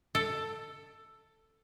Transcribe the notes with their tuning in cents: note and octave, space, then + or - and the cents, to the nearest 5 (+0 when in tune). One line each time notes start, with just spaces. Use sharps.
A4 +10